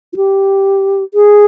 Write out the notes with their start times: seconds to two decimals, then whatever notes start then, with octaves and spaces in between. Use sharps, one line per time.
0.13 F4
0.16 G4
1.14 G#4